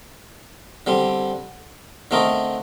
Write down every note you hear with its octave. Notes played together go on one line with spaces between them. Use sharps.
D3 G3 C4
D3 A3 C4 D#4 A#4